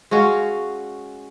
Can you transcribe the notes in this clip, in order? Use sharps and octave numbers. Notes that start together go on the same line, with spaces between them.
G#3 C#4 F#4 F5